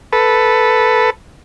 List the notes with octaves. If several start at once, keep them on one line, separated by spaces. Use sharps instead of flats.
A4 B4